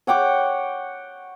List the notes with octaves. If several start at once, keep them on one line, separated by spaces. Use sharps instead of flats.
C#5 F#5 G5 D6